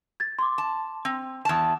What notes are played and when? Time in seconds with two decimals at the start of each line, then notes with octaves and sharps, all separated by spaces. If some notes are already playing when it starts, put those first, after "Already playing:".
0.20 G#6 A6
0.39 C6 D6
0.58 A5
1.05 C4
1.45 E2 A5